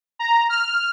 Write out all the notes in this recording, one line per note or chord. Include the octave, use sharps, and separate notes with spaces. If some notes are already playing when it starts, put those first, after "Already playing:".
A#5
F6